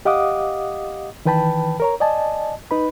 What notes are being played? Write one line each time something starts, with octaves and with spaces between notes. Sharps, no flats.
G4 D#5 F5 F#5 D6 D#6
D#3 E3 B4 G5 A5 B5
A#4 C#5 A#5
D5 D#5 G#5 A5
D#4 B4 B5